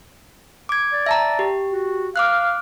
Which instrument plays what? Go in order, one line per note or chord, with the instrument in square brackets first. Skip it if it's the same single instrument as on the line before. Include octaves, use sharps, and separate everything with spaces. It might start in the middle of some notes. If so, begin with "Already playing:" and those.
[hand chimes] D6 G#6
[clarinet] D5
[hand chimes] E5 A5 A#5
G4
[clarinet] F#4
[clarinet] F5 [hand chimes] D6 F6 F#6